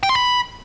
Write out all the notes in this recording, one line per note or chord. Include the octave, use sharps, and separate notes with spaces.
G5
C6
B5